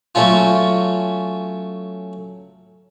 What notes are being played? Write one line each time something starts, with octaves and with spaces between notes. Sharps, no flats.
F#3 A3 C#4 F4